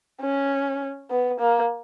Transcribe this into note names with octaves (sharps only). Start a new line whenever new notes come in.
C#4
B3
A#3